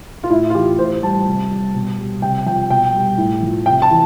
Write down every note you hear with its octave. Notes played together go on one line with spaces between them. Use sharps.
F4
A2 E4
F4
E3 G4
A2 C5
G3 A5
C3
G3
B2
G3
C3 G5
F3 G5
B2 G5
G3
A2
F3
C3 G5
A5
E3